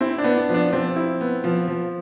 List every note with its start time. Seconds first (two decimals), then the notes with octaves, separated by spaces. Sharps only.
0.01 C4 E4
0.18 D4
0.24 B3
0.37 D4
0.49 F3
0.54 D4
0.73 F3 C4
0.96 E4
1.21 B3
1.44 F3
1.68 F3